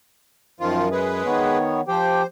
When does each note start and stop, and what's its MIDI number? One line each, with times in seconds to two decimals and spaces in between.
0.60 1.22 42
0.60 0.89 51
0.60 0.89 53
0.60 0.89 65
0.91 1.58 56
0.91 1.58 68
0.91 1.58 71
1.25 1.81 51
1.25 1.81 59
1.25 1.81 73
1.88 2.22 53
1.88 2.22 67
1.88 2.27 72
1.88 2.22 79